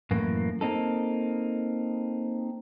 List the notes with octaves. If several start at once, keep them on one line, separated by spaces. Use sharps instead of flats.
F#2 A2 E3 A#3
A#3 C4 D#4 A4